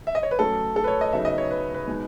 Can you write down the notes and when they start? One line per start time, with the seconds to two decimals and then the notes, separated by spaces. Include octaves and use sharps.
0.07 E5
0.15 D#5
0.23 C#5
0.31 B4
0.39 F#3 A3 C#4 A4
0.76 A4
0.84 B4
0.88 C#5
1.01 D#5
1.13 C#3 F#3 B3 D#4 E5
1.25 D#5
1.38 C#5
1.51 B4
1.74 B4
1.87 B2 G#3 D#4